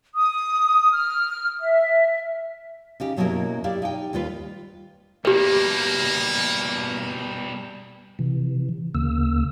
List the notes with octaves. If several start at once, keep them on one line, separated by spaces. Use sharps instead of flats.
D#6
F6
E5
C#3 D#4 G4
F#2 B2 F#3 A#3 E4 A#4
E4 G4 D5 F5
D#4 G4 G5
D#2 G3 F4 B4
B2 G3 A#3 G4 B4
C3 E3
D2 C#3 A#3 E6